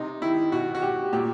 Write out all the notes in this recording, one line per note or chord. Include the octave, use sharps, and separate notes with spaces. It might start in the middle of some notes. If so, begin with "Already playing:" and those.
Already playing: C3 D#4
D#3 E4
B2 F#4
F#4
G4
A#2 G4